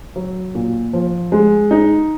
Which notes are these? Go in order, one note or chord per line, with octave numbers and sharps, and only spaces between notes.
F#3
A#2
F3
G#3
D#4